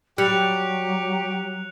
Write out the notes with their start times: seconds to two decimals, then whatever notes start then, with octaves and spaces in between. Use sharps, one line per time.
0.18 F#3 G3 G4 F#6 C#7 F7